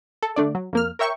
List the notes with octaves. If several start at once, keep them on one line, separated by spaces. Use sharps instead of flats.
A4
D3 A3 D4 D5
F#3
F2 A#3 F6
A#4 C#5 E5 G5 C#6